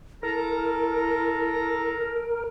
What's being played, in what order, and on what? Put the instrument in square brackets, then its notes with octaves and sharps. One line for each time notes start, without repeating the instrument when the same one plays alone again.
[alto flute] E4 [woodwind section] A4 A#5 [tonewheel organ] A#4